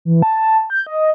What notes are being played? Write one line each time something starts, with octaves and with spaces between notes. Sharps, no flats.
E3
A5
G6
D#5